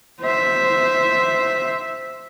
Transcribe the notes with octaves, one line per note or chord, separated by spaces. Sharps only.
C5 E5